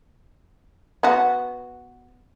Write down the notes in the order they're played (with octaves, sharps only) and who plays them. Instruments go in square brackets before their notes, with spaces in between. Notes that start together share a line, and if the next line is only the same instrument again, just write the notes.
[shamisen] B3 F#4